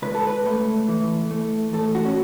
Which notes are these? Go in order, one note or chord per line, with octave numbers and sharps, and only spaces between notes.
C#2 B4
A4
B4
A3
E3
A3
A2 A4
F#4
C#4